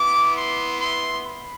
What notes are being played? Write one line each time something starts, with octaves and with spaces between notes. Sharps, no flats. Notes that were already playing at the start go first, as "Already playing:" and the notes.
Already playing: B3 E4 D6
C6
C6
B5